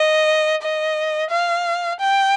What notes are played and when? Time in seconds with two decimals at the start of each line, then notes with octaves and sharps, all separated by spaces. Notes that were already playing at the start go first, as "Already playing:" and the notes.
Already playing: D#5
0.62 D#5
1.31 F5
2.01 G5